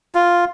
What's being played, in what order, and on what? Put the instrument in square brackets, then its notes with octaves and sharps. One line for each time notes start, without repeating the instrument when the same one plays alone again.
[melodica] F4